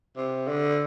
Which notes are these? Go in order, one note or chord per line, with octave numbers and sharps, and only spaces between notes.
C3
D3